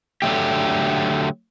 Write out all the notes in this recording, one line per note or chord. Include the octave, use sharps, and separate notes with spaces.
D3 F#3 A3 G4